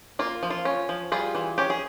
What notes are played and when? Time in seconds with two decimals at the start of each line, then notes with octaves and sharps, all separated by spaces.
0.19 A#3 F4
0.43 F3
0.50 F4
0.65 C#4
0.89 F3
1.12 G3 F4 G#4
1.35 E3
1.58 C#4 G4
1.70 G#4